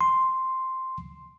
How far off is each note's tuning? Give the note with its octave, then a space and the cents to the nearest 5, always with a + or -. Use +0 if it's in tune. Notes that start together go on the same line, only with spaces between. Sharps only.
C6 +0